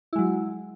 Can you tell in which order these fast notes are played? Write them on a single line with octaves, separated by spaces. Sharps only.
E4 G#3 F#3